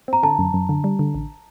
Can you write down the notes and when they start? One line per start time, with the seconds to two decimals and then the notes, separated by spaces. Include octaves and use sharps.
0.08 C4 A#5
0.23 D3 A5
0.39 F#2
0.54 F#2
0.69 D3
0.84 G3
0.99 D3
1.15 A1